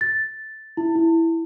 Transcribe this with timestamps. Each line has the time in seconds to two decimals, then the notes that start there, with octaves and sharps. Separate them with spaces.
0.01 A6
0.77 E4
0.96 E4